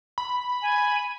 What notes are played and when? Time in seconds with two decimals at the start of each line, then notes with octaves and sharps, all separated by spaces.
0.18 B5
0.62 G#5